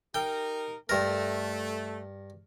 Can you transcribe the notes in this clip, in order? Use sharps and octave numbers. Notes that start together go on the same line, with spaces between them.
D#4 G4 A#4 G5
G2 A3 A#4